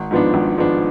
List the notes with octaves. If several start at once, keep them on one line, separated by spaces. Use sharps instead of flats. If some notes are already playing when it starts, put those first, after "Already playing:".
Already playing: G#1
G#2 F3 B3 D4
G#1
G#2 F3 B3 D4